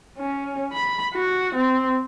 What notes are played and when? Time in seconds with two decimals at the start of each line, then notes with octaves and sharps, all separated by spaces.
0.18 C#4
0.73 B5
1.15 F#4
1.55 C4